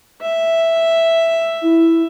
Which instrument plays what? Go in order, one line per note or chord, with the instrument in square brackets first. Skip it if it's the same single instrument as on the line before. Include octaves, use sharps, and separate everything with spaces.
[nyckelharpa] E5
[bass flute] E4